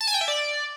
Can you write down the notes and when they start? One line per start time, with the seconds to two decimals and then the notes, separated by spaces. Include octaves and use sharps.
0.01 A5
0.07 G#5
0.14 G5
0.21 E5
0.28 D5